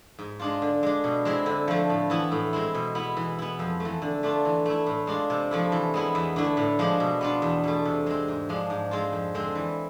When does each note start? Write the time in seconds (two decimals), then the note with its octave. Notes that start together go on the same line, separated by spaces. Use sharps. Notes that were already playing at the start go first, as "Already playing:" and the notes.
0.19 G#2
0.39 G#3 D4 F4
0.62 D3
0.83 G#3 D4
1.04 B2
1.25 G#3 C4 E4
1.46 D3
1.68 F3 A3
1.89 A2
2.10 E3 B3 E4
2.32 A2
2.53 G#3 C4 E4
2.74 B2
2.95 B3 E4
3.17 E3
3.39 B3 E4
3.59 F2
3.80 A3
3.85 E3
4.02 D3
4.23 A3 D4 F4
4.45 E3
4.66 A3 E4
4.86 A2
5.07 G#3 D4 F4
5.30 C3
5.51 F3 A3 E4
5.72 E3
5.94 G#3 B3 E4
6.15 E2
6.36 D3 A3 E4
6.57 A2
6.79 F3 G#3 D4
7.00 B2
7.21 B3 D4 F4
7.42 E2
7.64 B2 A3
7.85 C3
8.06 G#3 C4
8.28 G#2
8.49 F3 G#3 D4
8.70 G#2
8.91 G#3 C4 F4
9.12 F2
9.34 D3 G#3 C4
9.55 E3